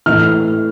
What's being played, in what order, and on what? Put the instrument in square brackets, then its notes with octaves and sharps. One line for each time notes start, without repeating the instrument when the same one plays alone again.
[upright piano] A2 E3 F6